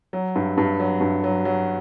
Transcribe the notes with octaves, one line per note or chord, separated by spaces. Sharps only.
F#3
G2
G2
F#3
G2
F#3
F#3